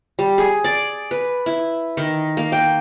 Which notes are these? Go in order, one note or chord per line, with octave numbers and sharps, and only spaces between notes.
G3
G#4
D5
B4
E4
D#3
A#3
G5